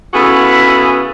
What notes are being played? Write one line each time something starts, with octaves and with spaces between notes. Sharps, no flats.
C#3 B3 E4 F#4 G#4 A4